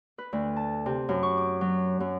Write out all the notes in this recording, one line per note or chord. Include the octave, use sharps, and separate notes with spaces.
B4
D2
A5
C3
F#2
C#6
D6
F#3
F#2